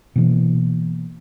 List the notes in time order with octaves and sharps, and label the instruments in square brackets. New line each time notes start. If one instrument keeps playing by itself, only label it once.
[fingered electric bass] B2 E3 A#3